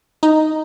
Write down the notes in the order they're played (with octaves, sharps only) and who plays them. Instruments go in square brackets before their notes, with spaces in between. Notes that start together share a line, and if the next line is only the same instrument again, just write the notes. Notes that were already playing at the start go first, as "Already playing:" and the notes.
[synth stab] D#4